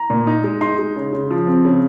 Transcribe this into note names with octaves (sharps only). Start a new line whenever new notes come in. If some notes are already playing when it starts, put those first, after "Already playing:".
Already playing: A#5
A#2
D#4
G#3
D#4 C6
G#3
C#3
C#3
F3
C4
C#3